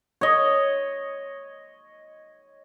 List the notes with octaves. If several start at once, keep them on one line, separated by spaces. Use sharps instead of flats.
C#5 D#5